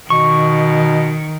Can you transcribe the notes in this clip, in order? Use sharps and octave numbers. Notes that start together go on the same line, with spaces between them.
B2 D#3 C#6